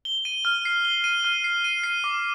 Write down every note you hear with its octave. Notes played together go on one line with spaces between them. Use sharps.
G7
D#7
F6
C7
G7
D#7
F6
C7
D#7
C7
D6